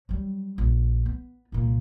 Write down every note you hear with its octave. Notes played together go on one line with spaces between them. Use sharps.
F#3 G3
A#1
B3
C2 A#2